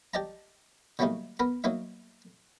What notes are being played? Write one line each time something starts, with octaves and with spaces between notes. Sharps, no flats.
G4 D5 D#5 A5 A#5
D3 F#3 G3 A3 A#3 D#4
B3 A#4 B5
F#3 A#3 D#4 E5